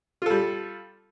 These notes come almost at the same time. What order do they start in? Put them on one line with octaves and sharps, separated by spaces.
F4 A4 G3